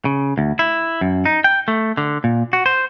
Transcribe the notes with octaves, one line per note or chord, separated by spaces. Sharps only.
C#3
D2
E4
F#2
D#4
G5
A3
D3
A#2
F#4
C5